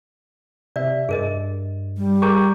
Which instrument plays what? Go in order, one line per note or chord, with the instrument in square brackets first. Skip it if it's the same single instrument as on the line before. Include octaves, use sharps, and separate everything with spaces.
[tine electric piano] C3 E5 [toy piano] D5
[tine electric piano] G2 [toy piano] G#4 A#4 D#5
[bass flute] G3
[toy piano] G#4 A#4 A#5 [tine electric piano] C#6 D6 G6